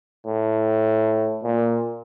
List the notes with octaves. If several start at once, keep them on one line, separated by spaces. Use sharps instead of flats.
A2
A#2